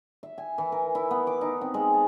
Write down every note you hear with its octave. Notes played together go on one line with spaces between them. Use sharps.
E5
G#5
E3
A#4
E4
B3
D6
D#4
C4
G#3
A5